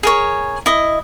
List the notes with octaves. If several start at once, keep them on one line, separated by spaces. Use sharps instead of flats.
G#4 A#4 C#5
E4 D#5